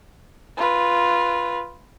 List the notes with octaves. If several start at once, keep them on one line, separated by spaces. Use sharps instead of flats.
F4 B4